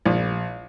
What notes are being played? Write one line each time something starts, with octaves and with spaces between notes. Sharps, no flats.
A#1